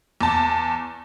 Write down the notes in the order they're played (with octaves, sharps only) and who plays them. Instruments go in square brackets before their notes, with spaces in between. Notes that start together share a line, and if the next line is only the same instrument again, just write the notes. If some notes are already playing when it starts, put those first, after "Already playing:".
[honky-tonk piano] E2 A5